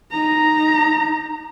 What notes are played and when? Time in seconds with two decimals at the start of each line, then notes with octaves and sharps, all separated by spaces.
0.11 D#4 A#5